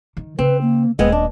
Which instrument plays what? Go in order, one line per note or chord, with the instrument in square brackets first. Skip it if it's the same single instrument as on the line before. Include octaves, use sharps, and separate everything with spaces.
[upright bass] D#3
[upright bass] C#3 [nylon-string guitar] C4 [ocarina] B4
[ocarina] A#3
[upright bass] D#1 [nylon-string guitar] G#3 B3 C4 [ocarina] D#5
[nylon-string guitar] D4